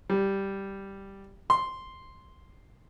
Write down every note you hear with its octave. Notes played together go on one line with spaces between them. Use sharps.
G3
C6